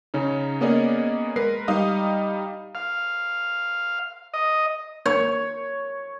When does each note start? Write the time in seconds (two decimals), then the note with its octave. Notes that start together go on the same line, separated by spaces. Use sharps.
0.14 C#3 C#4 D#4
0.61 A#3 B3 C#4 G#4 D5 D#5
1.36 G#3 A#4 B4 C7
1.68 G3 D#4 D#5 F5 D#6
2.75 F5
4.34 D#5
5.06 C#5